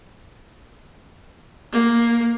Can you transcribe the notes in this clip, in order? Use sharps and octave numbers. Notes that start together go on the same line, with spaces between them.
A#3